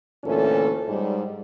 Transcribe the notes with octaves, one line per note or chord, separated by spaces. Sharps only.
D2 A#2 E3 C#4 A4
G#2 G3